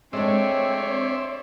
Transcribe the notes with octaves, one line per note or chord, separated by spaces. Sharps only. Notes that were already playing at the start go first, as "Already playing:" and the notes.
G#3 A3 C4 D4 C#5 D5 E5 C6